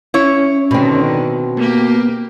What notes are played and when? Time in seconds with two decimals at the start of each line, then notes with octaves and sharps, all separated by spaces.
0.14 C#4 E4 C#5
0.71 B2 D3 D#3 C4
1.57 A#3 B3 G4